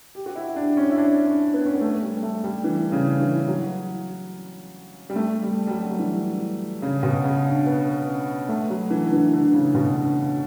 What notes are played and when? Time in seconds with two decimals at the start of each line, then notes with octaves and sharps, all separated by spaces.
0.15 G4
0.26 F#4
0.35 E4
0.56 D4
0.77 C#4
0.90 E4
0.98 D4
1.26 C#4
1.54 B3
1.66 C#4
1.74 B3
1.81 A3
2.02 G3
2.23 A3
2.44 G3
2.64 E3
2.92 C#3
3.20 E3
3.48 F#3
5.10 G3
5.16 A3
5.43 G3
5.67 G3
5.71 F#3
5.85 G3
5.92 F#3
5.99 E3
6.82 C#3
7.03 B2
7.24 C#3
7.45 D3
7.66 B3
8.07 C#4
8.49 A3
8.70 F#3
8.91 E3
9.06 D3
9.12 E3
9.33 D3
9.54 C#3
9.74 B2
9.89 D3
9.95 C#3